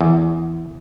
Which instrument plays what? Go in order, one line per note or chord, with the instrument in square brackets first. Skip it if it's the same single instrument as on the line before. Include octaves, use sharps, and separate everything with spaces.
[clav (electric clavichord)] E2